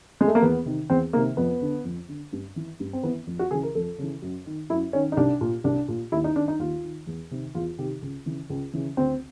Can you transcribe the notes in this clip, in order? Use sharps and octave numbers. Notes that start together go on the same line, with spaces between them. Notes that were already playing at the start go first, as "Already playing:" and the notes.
G#3
A3
A#3
E2 B3
C3 D#3
E2 C4
C3 D#3 A#3
F2 B3
D3
F2
D3
G2
E3
G2
C4
E3 B3
F2
F#4
C#3 E3 G#4
A#4
F2 A4
C#3 E3
F#2
D#3
F#2 E4
D#3 C#4
D#4
C2 D4
A#2
C2 D4
A#2
D#2 E4
D#4
D#3 D4
D#4
D#2 F4
D#3
E2
C3 D#3
E2 F4
C3 D#3 G4
C#2
C#3 E3
C#2
C#3 E3
D2 C4